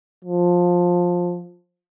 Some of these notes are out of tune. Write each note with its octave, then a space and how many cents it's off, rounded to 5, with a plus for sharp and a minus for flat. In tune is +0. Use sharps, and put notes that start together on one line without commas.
F3 +15